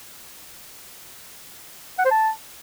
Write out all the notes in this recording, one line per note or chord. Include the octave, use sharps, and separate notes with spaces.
F#5
C5
A5